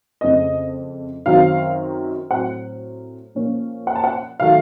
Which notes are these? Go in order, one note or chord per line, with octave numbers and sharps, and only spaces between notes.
F2 C#3 A3 C4 D#5
F#2 D#3 F#3 C4 F5
A2 F#3 C4 F#5
A#2 F3 A#3 C#4
F#5
A5
F#5
D#3 F#3 A3 F5